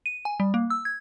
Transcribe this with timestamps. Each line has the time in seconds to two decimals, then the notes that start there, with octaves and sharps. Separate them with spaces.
0.06 D#7
0.25 G#5
0.40 G3
0.54 A#3
0.70 E6
0.85 G#6